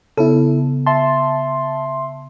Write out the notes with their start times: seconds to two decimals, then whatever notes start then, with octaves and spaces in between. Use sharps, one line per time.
0.18 C#3 B3 E4 A4
0.86 E5 A5 C6